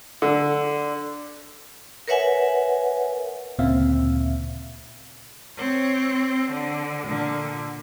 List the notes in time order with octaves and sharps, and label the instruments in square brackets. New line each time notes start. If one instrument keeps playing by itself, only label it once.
[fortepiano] D3
[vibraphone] A#4 B4 C#5 E5 F#5 G#5
[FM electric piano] D2 A#2 C#3 C4 E5 F5
[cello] C4 C#5
D3
A#2 D3